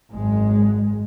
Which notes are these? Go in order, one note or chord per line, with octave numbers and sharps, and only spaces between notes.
G#1 F#2 G#3